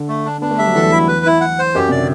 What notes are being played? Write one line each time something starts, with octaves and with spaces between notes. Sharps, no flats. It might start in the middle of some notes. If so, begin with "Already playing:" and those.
Already playing: D3
A3
D4
B3 D4
A3
G3 E5
F#3
E2 E3 A4
E4
B4
E4
F#5
C5
F#2 F#3 G4
C3 D5
D3